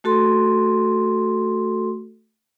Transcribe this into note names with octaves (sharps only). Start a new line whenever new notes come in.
A3 F#4 A4 C6